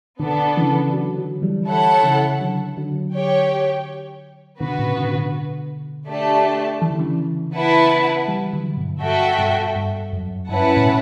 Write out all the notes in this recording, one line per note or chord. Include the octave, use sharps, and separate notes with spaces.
B2 D3 B3 D4 A4
C#3 E3
D3 F#3
D3 F#3
E3 G3
E4 A4 C#5 F#5
C#3 E3
D3 F#3
D3 F#3
G4 C#5 G5
B2 D3 B3 F#4 B4
A2 C#3
B2 D3
B2 D3
A3 D4 G4 D5 A5
E3
D3
C#3 E3
B3 E4 B4 F#5 A5
E3 G3
D3 F#3
G2 B2
G2 F#4 A4 E5 G5
G2 B2
G2
F#2
G2 C#4 E4 B4 F#5 A5
A2
B2